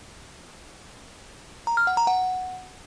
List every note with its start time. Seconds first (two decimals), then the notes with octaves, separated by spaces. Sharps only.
1.67 A#5
1.77 F6
1.87 F#5
1.97 A#5
2.07 F#5